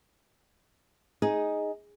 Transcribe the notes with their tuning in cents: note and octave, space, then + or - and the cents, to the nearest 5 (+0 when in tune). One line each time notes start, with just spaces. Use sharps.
D#4 +5 G#4 +0